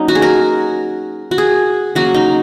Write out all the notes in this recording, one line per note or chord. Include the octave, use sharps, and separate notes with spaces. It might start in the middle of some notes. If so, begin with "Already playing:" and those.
Already playing: F#3 A#3 C#4 D#4
F#4
G#4
A#4
F#4
G#4
C#3 F#3 A#3 F#4
D#4